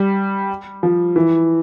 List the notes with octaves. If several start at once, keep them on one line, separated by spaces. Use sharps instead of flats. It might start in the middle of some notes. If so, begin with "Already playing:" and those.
Already playing: G3
F3
E3